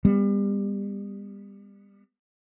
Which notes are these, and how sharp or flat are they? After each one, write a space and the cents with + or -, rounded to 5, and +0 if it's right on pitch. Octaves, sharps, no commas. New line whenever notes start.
G3 +30 B3 -5